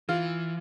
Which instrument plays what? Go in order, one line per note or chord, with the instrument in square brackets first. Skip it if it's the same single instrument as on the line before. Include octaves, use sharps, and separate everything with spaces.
[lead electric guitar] E3 [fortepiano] F4